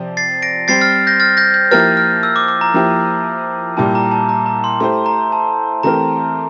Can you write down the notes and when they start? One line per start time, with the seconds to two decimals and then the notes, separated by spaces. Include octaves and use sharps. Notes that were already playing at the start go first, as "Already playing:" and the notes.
Already playing: C3 F3 C4 G4 D5
0.17 A6 C7
0.42 A#6 D7
0.68 G3 C4 G4 C5 A6 C7
0.81 F6 A6
1.07 G6 A#6
1.20 F6 A6
1.37 G6 A#6
1.54 G6
1.71 F3 A#3 E4 G4 A#4 F6 A6
1.97 F6
2.23 E6
2.36 D6
2.48 D6
2.61 A#5
2.74 F3 A#3 E4 G4
3.77 A#2 G3 A#3 E4 G4 A5
3.95 A#5
4.11 A5
4.29 A#5
4.46 A#5
4.64 C6
4.80 A3 E4 G4 C5 C6
5.06 A#5
5.32 A5
5.83 E3 A3 C4 G4 A#4 A#5